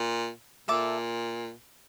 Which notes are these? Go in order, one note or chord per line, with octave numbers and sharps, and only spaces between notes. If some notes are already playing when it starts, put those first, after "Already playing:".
Already playing: A#2
A#2 A4 E5 A5 D6